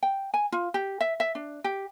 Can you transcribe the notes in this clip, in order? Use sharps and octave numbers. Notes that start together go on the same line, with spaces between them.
G5
G#5
F4
G4
E5
E5
D4
G4